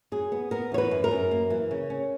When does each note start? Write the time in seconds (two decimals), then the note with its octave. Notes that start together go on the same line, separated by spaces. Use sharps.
0.12 F#2 G#4
0.32 B3
0.51 B3 A#4
0.72 E3 C#5
0.78 B4
0.91 F#2
1.04 A#4
1.11 F#2
1.31 A#3
1.50 E3
1.71 C#3
1.90 C#4